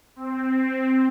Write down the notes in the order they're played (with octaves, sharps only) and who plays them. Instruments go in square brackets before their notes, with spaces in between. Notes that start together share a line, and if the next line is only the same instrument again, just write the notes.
[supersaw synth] C4